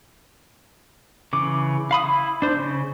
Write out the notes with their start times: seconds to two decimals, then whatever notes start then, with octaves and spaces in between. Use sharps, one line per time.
1.33 C#3 E3 D6
1.91 F5 B5 D#6
2.04 E4
2.42 D4 C5
2.56 C#3